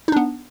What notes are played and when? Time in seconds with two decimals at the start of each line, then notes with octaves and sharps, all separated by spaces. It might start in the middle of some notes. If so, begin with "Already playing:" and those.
0.08 D#4
0.12 D4
0.16 B3